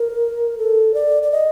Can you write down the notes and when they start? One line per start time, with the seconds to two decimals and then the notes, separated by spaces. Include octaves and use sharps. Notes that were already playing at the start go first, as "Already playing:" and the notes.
Already playing: A#4
0.58 A4
0.94 D5
1.23 D5
1.32 D#5